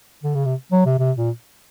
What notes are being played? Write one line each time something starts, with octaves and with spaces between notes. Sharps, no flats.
D3
C#3
C3
F#3
C3
C3
A#2